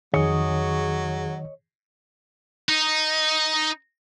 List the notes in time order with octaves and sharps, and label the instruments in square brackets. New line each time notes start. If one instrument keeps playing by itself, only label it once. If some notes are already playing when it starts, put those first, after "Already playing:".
[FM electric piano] F2 G#4 [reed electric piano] D#3 [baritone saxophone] F#3 [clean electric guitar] C#5 D#5
[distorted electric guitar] D#4